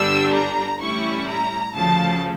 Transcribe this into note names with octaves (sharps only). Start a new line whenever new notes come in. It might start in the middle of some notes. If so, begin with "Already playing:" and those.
Already playing: G1 G2 D3 G3 D4 E6
A#5
A1 A2 G3 C#4 E4 C#6
A#5
D2 C#3 F3 A5